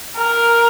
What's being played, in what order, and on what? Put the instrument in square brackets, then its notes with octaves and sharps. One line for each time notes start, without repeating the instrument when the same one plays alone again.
[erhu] A#4